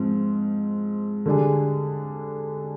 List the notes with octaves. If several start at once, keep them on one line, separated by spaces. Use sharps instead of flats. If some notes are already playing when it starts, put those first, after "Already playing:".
Already playing: G#2 F3 C4
D3 G3 D4 G#4